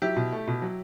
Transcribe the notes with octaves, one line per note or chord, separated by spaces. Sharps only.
F#3 E4 G4
B2
A3
B2
F#3